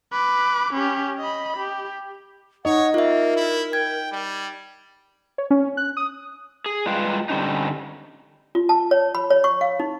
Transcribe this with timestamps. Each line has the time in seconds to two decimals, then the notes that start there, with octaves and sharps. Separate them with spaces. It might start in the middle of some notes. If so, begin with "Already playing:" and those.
0.12 B4 D6
0.74 C#4 G4
1.19 D#5 B5
1.58 G4
2.65 D#4 C#5 D#5 F#5
2.94 A#3 F4 A#4 E5
3.36 E4
3.73 G5 G#6
4.11 G3
5.38 C#5
5.50 C#4
5.77 F#6
5.97 D#6
6.66 G#4
6.86 G3 G#3 F4 B4 F5 G5
7.29 D3 G3 C4 C#4 D#4
8.55 F4
8.69 A5
8.91 C#5
9.15 B5
9.30 C#5
9.44 C#6
9.61 F5
9.80 D#4